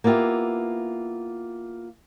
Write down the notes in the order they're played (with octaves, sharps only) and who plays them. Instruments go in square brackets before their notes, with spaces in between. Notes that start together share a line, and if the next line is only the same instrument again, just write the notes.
[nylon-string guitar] A#3 B3 E4 F4 G4